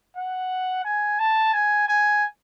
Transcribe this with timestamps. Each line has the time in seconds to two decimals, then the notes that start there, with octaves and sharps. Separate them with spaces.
0.16 F#5
0.85 G#5
1.19 A5
1.54 G#5
1.88 G#5